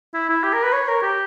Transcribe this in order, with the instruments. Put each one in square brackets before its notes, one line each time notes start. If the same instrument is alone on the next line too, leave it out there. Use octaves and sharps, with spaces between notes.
[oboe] E4
E4
G4
A#4
B4
C#5
A#4
G4